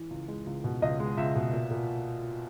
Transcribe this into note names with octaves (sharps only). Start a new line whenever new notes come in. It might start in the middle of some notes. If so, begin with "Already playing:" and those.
Already playing: E3
C#2
G#3
C#2
B2
C#2 D#5
G#3
C#2 E5
B2
A#2
A#2